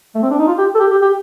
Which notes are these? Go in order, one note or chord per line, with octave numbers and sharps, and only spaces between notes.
A3
C4
D4
D#4
F4
G4
A4
G4
G4
G4